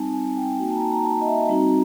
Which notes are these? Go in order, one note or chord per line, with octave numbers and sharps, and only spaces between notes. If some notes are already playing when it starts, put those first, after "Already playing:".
Already playing: G3 C4 D#4 G#5 A5
G#5
G5
G5
A#3 D#4 F#4 G#5
A5
A#5
A5
A#5
A5
D#5
E5
G3 C4 D#4 F#4 A#5